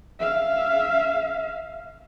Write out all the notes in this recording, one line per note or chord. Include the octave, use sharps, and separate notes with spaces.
E5 F5